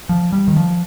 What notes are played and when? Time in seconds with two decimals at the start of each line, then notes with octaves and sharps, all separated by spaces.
0.09 F3
0.32 G3
0.48 D#3
0.56 F3